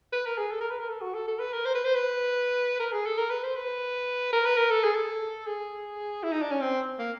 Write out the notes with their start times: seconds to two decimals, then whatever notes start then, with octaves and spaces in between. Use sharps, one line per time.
0.13 B4
0.26 A#4
0.38 G#4
0.51 A4
0.61 A#4
0.71 B4
0.79 A#4
0.89 A4
1.01 F#4
1.14 A4
1.28 A4
1.40 B4
1.53 A#4
1.66 C5
1.75 B4
1.84 C5
1.95 B4
2.80 A#4
2.92 G#4
3.06 A4
3.18 A#4
3.30 B4
3.43 C5
3.56 B4
4.33 A#4
4.46 B4
4.57 A#4
4.71 A4
4.84 G#4
4.95 A4
5.47 G#4
6.23 E4
6.32 D#4
6.42 D4
6.51 C#4
6.61 C4
6.99 A#3